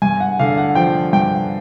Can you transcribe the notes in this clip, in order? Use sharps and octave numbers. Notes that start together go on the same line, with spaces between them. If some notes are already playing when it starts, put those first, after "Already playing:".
G2 G#5
F#5
D3 F5
F#5
F3 G5
G2 G5